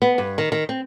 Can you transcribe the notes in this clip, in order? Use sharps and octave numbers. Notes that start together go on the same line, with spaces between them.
B3
G2
D#3
D#3
C4